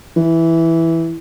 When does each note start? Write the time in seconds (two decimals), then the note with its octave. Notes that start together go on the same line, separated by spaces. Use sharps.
0.16 E3